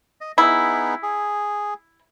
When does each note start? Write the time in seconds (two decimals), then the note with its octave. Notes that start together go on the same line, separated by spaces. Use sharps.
0.21 D#5
0.38 B3 D#4 E4 G#4
1.03 G#4